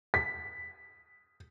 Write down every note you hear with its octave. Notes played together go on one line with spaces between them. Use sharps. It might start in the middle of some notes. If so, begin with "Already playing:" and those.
B6